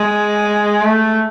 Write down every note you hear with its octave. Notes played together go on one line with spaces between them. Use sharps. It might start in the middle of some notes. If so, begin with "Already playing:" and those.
Already playing: G#3
A3